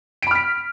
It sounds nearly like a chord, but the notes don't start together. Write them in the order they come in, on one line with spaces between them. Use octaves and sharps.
D7 B5 F6 B6